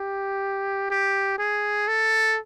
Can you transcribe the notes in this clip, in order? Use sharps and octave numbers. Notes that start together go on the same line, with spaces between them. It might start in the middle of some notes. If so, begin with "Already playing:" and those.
Already playing: G4
G4
G#4
A4